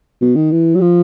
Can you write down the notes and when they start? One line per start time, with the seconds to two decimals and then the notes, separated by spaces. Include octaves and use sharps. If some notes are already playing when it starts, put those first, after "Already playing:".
0.21 B2
0.35 D#3
0.51 E3
0.75 F#3
0.81 F3